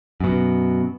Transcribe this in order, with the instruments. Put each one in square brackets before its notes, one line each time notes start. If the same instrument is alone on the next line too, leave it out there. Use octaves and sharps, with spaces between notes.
[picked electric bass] F#2 B2